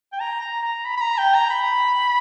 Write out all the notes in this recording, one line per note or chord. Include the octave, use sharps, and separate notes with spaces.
G5
A#5
A#5
A#5
B5
B5
A#5
G5
A#5
B5